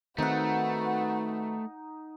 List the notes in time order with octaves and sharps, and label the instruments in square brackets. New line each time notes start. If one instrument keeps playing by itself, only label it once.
[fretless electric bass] D#3 C4 [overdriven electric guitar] A3 [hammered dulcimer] D#4 F#5 [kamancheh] F#4 B4